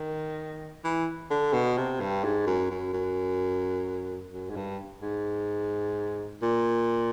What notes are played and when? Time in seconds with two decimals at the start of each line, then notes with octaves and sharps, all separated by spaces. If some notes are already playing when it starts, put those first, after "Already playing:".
Already playing: D#3
0.84 E3
1.30 D3
1.53 B2
1.77 C3
2.00 G2
2.24 G#2
2.47 F#2
2.70 F#2
2.93 F#2
4.33 F#2
4.50 G#2
4.56 G2
5.02 G#2
6.42 A#2